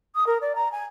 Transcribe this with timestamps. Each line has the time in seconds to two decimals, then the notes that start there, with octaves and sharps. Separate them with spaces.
0.15 D#6
0.26 A#4
0.41 D5
0.55 A#5
0.71 G#5